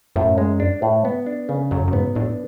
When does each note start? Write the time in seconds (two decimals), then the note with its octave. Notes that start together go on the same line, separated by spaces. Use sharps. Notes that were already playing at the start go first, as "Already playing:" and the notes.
0.16 F#2 A2
0.38 G#3
0.60 D4
0.82 A2
1.05 B3
1.26 D4
1.49 C#3
1.71 F#2 F#3
1.88 F#2
1.93 G#2 B3
2.15 A2 D4